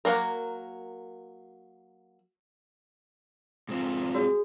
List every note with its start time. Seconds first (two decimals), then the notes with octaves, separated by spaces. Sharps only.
0.05 F#3 A3 A#3 A#4
3.69 G#2 C4 F4
4.14 F#4 G#4 C#5